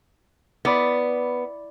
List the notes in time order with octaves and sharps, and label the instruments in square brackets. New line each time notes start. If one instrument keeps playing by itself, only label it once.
[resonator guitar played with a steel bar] B3 [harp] E4 D5 B5